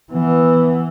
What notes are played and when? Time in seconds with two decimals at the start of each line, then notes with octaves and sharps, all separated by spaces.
0.12 E3 B3